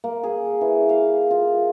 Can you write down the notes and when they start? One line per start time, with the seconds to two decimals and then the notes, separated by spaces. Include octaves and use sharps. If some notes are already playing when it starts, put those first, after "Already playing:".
0.04 A#3
0.23 G#4
0.61 E3
0.89 F5
1.31 F4